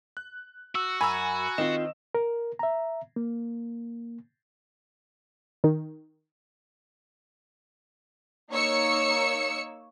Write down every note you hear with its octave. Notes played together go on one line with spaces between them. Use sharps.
F#6
F#4 E6
F#2 G#5 A#5 B5 E6
D#3 C4 F4 D#5 E7
A#4
E5 A#5
A#3
D#3
A#3 D#4 C#5 E6 C#7